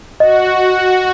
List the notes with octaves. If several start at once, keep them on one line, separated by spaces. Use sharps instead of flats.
F#4 D#5